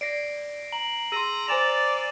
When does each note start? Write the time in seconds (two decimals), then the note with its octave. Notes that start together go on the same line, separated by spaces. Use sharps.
0.01 D5 A#6 C7 D7
0.72 A#5 F#7
1.12 G#4 A#5 C6 E6 D#7 F#7
1.48 C5 D5 G#5 A#5 A6 E7 F7